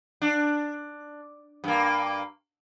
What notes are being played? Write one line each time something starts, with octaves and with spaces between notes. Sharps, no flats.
D4
G2 A#3